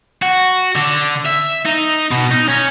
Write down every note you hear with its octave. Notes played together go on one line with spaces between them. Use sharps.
F#4
D3
E5
D#4
B2
D#4
C#4